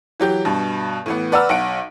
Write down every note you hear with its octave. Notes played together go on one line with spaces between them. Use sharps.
E3 F#3 G4 G6
G2 B2
A2 E3 B3
B4 D5 F#5 A#5 E6 F6
B1 F#5 D7